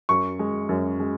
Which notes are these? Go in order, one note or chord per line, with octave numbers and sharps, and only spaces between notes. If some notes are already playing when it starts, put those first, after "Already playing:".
F#2 C#6
G#3
F#2
G#3